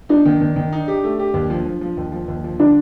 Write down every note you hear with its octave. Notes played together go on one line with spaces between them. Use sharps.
D4 D#4
D#3
D#3
D#3
D#4
G4
A3
G4
D#2
F3
F3
F3
D#2
F3
D#2
F3
D3 D4